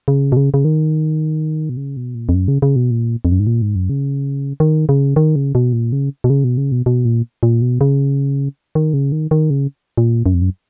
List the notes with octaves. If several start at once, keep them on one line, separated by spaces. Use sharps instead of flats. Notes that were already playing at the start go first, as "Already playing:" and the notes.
C#3
B2
C#3
C#3
D#3
B2
C#3
B2
A#2
F2
F#2
C#3
C#3
B2
A#2
F2
F#2
G#2
A#2
G#2
F#2
C#3
D#3
C#3
D#3
C#3
B2
A#2
C#3
B2
C#3
B2
C#3
B2
B2
A#2
A#2
B2
C#3
D#3
C#3
D#3
D#3
C#3
A#2
F#2
F2
F#2